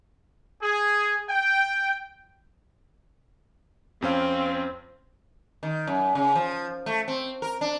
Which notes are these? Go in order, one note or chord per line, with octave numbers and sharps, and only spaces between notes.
G#4
G5
F2 C4 C#4 F5
D#3
F#2
C#3
F3
A3
C4
A#4
D4